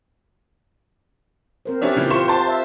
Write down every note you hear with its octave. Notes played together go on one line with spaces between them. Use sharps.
C4 A#4 C5
C#4 D4 G4 B4 D5 E5
A#2 C#3 E3
F4 C5 F5 C#6 E7
C5 A5
E5